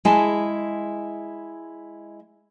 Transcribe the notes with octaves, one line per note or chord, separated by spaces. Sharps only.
G#3 E4 G#5 A5